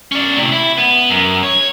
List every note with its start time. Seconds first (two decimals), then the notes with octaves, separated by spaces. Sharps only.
0.12 C#4 D5
0.36 A2 C3
0.52 E4
0.78 B3
1.10 F#2
1.43 C#5